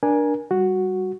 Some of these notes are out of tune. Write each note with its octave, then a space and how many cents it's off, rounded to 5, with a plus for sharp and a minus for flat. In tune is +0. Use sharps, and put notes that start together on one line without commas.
D4 +0 A#4 +25 G#5 +0
G3 +0 F#4 +0